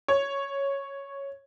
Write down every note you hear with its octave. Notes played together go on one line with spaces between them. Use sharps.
C#5